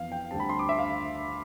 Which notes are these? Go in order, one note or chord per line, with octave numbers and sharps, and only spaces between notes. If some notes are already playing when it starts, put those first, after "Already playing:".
Already playing: F2 E3 B3 F5
G5
D2 D3 G3 C4 A5
B5
C6
D6
E5
F5